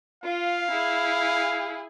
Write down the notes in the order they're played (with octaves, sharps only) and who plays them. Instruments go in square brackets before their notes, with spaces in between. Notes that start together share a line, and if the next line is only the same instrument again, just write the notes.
[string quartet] F4 [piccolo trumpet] F5
[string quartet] E4 G#4